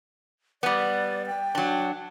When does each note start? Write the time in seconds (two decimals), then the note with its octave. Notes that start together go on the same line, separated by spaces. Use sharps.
0.63 G3 B3 D5
1.27 G5
1.55 F#3 D4